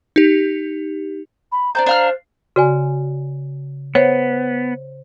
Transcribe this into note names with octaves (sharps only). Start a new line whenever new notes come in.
D#4 G4
B5
D4 C5 A5 A#5 G6
D4 F5 F6
C#3 F#4 D5 G#5
B3 C5 C#5 E5 F#5